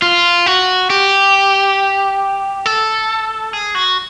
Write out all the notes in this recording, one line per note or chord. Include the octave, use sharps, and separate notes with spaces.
F4
F#4
G4
A4
G#4
F#4